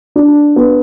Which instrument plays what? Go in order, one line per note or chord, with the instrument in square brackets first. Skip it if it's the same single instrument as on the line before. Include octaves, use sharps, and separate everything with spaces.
[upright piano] D4
B3